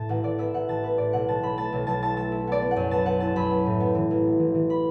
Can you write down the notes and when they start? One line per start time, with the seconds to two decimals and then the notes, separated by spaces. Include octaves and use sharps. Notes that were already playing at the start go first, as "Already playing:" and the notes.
Already playing: A2 A5
0.09 A1 F#5
0.23 A1 D5
0.38 B3 E5
0.53 A1 F#5
0.68 A1 A5
0.83 B3 B4
0.98 A2 D5
1.13 B1 F#5
1.28 B1 A5
1.43 B1 B5
1.57 A3 A5
1.73 B1
1.87 B1 A5
2.02 E4 A5
2.16 A3 A5
2.32 E4
2.47 B3 D5
2.62 B3
2.71 F#5
2.76 F#2
2.91 B3 A5
3.06 B3 F#5
3.20 E4 A5
3.36 F#2 B5
3.50 B3
3.66 A2
3.80 B3
3.95 E3
4.11 A1
4.25 B3
4.40 E3
4.55 E3
4.70 B5